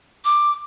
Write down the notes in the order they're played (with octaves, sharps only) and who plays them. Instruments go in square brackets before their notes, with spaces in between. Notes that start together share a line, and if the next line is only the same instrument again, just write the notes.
[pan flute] D6